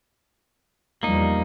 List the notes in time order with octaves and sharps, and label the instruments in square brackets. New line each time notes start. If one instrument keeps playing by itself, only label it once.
[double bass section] E2 F3 G3 [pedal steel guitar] A#3 D#4